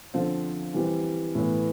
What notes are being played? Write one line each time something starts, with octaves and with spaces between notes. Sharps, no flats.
D3 F3 C4
E3 G3 C4 G4
A2 E3 B3